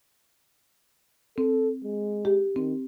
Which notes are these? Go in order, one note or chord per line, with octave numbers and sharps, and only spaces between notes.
C4 A4
G#3
G4
D#3 C4